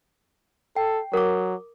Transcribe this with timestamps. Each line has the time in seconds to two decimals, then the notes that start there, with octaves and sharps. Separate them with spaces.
0.76 A4 G5
1.14 F#3 A#4 D6